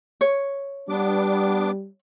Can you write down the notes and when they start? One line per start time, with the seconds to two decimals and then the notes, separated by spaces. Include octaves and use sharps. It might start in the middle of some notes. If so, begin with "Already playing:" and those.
0.21 C#5
0.89 G3 B3 D4 D6